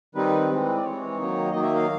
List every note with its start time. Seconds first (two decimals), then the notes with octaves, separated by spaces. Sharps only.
0.15 D#3 G3 C4 D#4 B4
0.50 E3 G#3 C4
0.76 D5
0.83 E3 G#3 C4 C#5
1.17 D#3 F#3 A#3 D#4
1.51 D#3 F#3 A#3 D#4 D#5
1.63 E5
1.75 F5